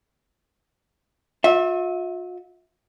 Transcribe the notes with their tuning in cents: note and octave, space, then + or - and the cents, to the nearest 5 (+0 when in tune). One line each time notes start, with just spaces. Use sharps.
F4 +45 E5 -20